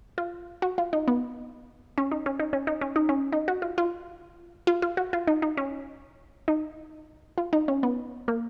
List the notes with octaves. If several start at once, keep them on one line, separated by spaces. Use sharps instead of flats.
F4
F#4
F4
D#4
B3
C#4
D#4
C#4
D#4
C#4
D#4
C#4
D#4
C#4
D#4
F#4
F4
F4
F4
F4
F#4
F4
D#4
D#4
C#4
D#4
F4
D#4
C#4
B3
A#3